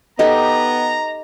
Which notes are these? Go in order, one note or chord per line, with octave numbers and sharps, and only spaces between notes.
B3 D#4 G4 A4 D#5 A#5